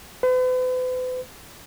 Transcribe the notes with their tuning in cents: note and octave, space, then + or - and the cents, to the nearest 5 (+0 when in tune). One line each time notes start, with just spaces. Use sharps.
B4 +45